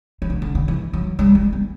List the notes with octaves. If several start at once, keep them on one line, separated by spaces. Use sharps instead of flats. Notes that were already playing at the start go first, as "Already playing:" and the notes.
E3
D3
D3
D3
E3
F#3
G3
G3
B3